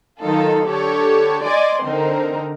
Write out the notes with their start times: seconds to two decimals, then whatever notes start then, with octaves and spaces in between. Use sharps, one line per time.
0.21 D#3 F#3 D#4 F4 A4
0.67 D3 G4 A4 C#5
1.44 D5 D#5 G#5 C6
1.82 D3 C4 D#4 A#4